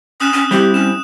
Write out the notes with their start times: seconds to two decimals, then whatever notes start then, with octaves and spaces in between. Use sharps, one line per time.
0.20 C#4 D#6 F#6 E7
0.33 C#4
0.51 G3 C4 E4 G4
0.74 C#4 E7